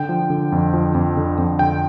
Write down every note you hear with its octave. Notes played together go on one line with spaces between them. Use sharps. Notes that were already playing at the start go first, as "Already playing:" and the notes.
Already playing: D3 G5
F3
D3
F2
F3
F2
D3
F2
D3 G5